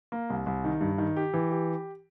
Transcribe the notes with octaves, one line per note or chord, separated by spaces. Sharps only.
A#3
C2
C2
D#3
G2
D#3
G4
E3
G4